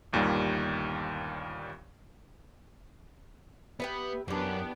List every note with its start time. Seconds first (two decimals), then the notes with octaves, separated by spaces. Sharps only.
0.13 G1 D#2 A#2 D#3 G3
3.80 B3 G4 B4 E5
4.28 F#2 E3 B3 D4 G4